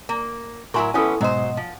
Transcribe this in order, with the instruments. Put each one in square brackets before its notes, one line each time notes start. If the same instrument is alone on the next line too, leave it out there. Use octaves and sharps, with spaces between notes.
[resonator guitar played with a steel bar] A#3
[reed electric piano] A2 [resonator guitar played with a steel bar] F#3 E4 A#4 [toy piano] G#5 C6 C#6
[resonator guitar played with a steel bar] E3 B3 C#4 [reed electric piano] E4 A4 [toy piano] G#5 D#6
[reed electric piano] G#2 B2 D#5 [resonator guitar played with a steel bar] F#3 C5
[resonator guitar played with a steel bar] F3